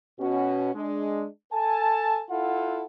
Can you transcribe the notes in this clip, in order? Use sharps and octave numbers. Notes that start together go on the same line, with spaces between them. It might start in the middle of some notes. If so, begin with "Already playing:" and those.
B2 C#4 F#4
G#3 D4
A4 G#5 A5
E4 F4 A4 F#5